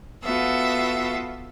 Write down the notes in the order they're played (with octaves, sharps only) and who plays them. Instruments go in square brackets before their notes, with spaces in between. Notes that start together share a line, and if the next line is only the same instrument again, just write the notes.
[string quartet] B3 F4 F#4 A4 E5